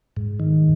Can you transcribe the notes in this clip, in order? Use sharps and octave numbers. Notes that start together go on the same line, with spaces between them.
G#2
D#3